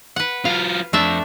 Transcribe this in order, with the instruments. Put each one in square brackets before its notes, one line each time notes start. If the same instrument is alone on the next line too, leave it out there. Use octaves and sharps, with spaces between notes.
[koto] B4 F#5
[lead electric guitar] F#3 F4 [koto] F5
[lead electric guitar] F2 [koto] A3 D4 E5